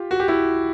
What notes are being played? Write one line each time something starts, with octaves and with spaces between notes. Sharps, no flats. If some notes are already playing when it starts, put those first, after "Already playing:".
Already playing: F4 G4
F#4
G4
E4 F#4